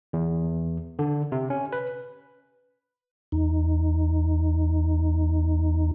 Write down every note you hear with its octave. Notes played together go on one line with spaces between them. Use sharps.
E2
D3
C3
C#4
B4
E2 D#4